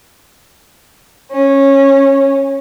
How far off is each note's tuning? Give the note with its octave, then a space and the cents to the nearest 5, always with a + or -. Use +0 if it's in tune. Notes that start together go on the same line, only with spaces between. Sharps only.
C#4 -15